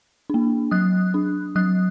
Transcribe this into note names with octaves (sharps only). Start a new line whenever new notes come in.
A#3 D4
F#3 D#6 F#6
D4
F#3 D#6 F#6